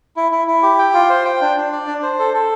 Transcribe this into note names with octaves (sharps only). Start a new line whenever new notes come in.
E4
E4
E4
G4
G5
F4
C5
G5
D4
D4
D5
D4
C5
A4
A4